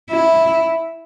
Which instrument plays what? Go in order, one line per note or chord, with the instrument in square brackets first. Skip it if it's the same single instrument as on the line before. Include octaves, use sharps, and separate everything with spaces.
[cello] E4